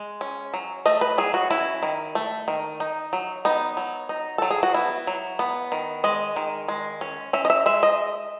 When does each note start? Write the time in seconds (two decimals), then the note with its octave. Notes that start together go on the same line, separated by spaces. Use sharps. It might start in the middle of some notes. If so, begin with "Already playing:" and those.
Already playing: G#3
0.21 C#4
0.54 F#3
0.86 A3 D#5
1.01 B4
1.18 F#3 G#4
1.34 F#4
1.51 C#4 E4
1.83 D#3
2.15 A3
2.48 D#3
2.80 D#4
3.13 F#3
3.45 B3 D#4
3.77 F#3
4.09 D#4
4.38 F#3 A4
4.51 G#4
4.63 F#4
4.74 B3 E4
5.07 F#3
5.39 B3
5.72 D#3
6.04 G#3 D#5
6.36 D#3
6.68 G#3
7.01 C#4
7.33 C#4 E5
7.45 D#5
7.50 E5
7.66 G#3 E5
7.83 D#5